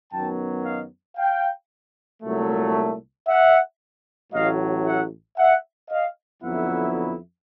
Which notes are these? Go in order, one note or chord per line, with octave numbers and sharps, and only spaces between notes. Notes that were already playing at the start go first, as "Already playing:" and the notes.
F#2 D#3 F#3 B3 G5 A5
D#5 F5
F5 G5
C2 A#2 F#3 A3
E5 F#5
A1 A2 F#3 D#5 F5
E5 F#5
E5 F#5
D#5 F5
F2 D3 F#3 B3 E4 E5 F#5